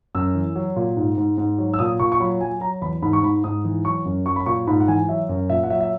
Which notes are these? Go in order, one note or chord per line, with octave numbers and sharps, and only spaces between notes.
F#2 E6
E3
F#3
A#2
G#2
G#2
G#2
F#3
E6
A#2 D#6
A#2 C#6
C#6
F#3 B5
F#3 G#5
F#3 A#5
E2 B5
G#2 B5
C#6
G#2 B5
G#2 D#6
E3
F#3 C#6
F#2
F#3 C#6
B5
A#2 C#6
G#2 B5
F#5
E3 G#5
F#3 E5
F#2
A#2 E5
F#5
F#3 E5
E5